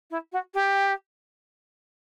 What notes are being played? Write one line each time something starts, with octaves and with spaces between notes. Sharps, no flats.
E4
F#4
G4